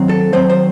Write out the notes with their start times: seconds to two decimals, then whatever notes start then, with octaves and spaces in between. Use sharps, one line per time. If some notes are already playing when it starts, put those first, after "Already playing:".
Already playing: D#3 F#3 C4
0.09 A4
0.33 D#3 F#3 C4 C5
0.50 C5